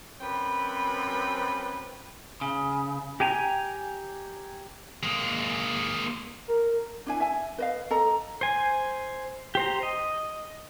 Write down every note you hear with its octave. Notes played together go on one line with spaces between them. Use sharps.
F#2 C4 B4 G5 B5
C#3
G4 G5 G#5 A#5
G#3 A#3
A#4
D4 E4 G#5
E5 G#5
B4 D#5 F5
A4 D#5 A#5
C5 G#5
G4 C5 A#5
D#5